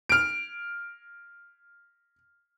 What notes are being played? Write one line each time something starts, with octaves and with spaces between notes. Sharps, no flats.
F6 D7